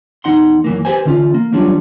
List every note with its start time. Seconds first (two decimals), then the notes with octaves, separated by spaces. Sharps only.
0.24 E2 D#4 F#5 C6
0.64 F#2 E3 A#3
0.85 G4 B4 C5 G#5
1.05 D3 E3 C#4 F4
1.34 A#3
1.52 E3 F#3 G3 C#4 D4 F4